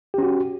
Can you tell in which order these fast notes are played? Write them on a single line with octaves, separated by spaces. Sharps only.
G4 C#4 F#4